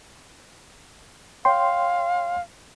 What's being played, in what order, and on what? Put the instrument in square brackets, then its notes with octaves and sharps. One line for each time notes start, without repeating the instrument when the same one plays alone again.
[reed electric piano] C#5 G5 C6 [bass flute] F5